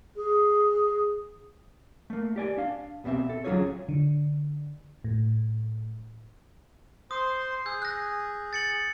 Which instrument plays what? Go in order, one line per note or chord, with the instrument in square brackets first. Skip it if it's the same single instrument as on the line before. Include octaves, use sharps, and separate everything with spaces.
[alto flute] G#4
[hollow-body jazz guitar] A3 A#3
G4 D5 G#5
D4 F5
C2 B2 D#3 C4 E5
A4
D2 F#3 C#4 F4 G#4 C#5
[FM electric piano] D3
A2
[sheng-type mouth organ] C5 C6 [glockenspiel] D#6
[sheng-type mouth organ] G#4 [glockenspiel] E6 G6
[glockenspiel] F#6 A#6
A6 C#7 F#7